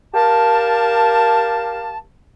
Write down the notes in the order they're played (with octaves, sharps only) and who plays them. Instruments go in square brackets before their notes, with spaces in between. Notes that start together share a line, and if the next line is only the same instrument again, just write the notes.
[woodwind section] G4 A#4 F5 A5